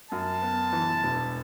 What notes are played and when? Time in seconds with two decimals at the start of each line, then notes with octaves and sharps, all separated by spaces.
0.11 F#2 A5
0.42 B3
0.73 E3
1.03 E1